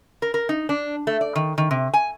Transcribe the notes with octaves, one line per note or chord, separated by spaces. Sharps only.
A#4
A#4
D#4
D4
A3
D5
D#3
D#3
C3
G#5